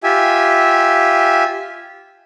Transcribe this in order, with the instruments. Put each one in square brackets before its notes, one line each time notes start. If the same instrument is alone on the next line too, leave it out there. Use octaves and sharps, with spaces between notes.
[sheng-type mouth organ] F4 G4 E5 G#5